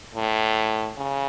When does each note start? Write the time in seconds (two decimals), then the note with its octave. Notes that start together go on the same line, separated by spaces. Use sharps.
0.14 A2
0.98 C#3